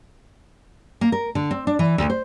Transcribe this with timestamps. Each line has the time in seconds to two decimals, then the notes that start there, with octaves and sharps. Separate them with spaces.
1.01 A#3
1.12 A#4
1.35 D3
1.51 C4
1.67 D4
1.79 E3
1.98 D2
2.10 C5